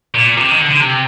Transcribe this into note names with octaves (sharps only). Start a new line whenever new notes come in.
A#2
C3
D#3
D3
D3
C3